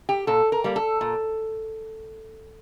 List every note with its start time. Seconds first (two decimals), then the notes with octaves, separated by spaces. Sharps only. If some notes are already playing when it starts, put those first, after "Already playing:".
0.09 G4
0.27 A#2 A4
0.52 A#4
0.64 G3 A#3
0.76 A4
1.01 A#2